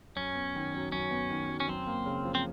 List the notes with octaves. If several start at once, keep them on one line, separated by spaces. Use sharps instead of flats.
F#2 C#4
B3
D#3
F#3
F#2 C#4
B3
D#3
F#3
C#4
F#2 C4
A#3
C#3
F3
C4